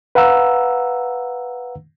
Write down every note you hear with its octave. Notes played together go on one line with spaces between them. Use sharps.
B4 F5 F#5 A#5 E6